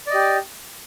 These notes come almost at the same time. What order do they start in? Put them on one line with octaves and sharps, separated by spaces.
D5 D#5 G4